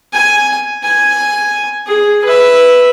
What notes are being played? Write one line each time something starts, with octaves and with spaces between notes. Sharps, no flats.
G#5
G#5
G#4
B4 E5